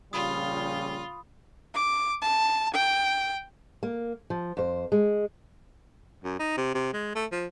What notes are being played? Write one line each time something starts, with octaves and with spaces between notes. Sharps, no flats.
A#1 C#3 G3 F4 B5 D#6
D6
A5
G5
A#3
F3
F2 C5
G#3
F#2
D#4
C3
C3
G#3
A3
F3